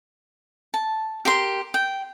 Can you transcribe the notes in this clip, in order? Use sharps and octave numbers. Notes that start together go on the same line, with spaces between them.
A5
G4 A#4 C6
G5